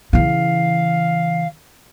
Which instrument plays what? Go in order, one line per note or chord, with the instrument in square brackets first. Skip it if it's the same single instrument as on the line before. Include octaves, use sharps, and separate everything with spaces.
[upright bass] C#3 E3 [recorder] F5